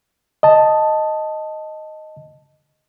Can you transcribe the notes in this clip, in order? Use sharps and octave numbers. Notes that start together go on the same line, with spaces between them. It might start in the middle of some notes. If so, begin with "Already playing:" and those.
D#5 A5